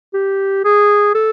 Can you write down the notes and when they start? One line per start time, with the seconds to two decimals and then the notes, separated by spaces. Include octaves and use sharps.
0.14 G4
0.65 G#4
1.15 A4